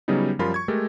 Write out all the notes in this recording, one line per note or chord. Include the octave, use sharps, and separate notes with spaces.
C#3 F#3 G3 B3 D#4
F#2 F3 G3 F4 A#4 B5
C#6 G#6
G#3 A3 G4 A4 A#4